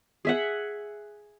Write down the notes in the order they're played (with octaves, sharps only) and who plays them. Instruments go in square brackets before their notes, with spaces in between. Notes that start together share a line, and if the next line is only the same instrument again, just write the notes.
[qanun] G#4 E5 F#5